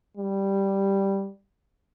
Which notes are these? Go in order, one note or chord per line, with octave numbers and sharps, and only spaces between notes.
G3